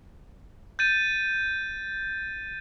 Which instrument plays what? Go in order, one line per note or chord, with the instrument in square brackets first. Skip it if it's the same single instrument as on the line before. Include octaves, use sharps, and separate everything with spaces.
[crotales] G6 A6 D#7